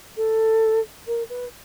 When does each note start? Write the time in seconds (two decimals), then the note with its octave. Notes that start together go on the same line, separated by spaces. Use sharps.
0.17 A4
1.07 A#4
1.29 B4